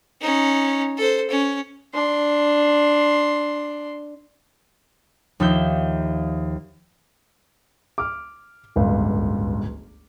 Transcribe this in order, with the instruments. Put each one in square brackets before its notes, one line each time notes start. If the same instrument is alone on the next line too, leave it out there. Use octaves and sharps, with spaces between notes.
[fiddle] C#4 D#4
A4 C5
C#4
[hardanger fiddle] D4 C6
[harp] D#2 F3 D#4 E5 G6
[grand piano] D6 F6
D1 G1 C#2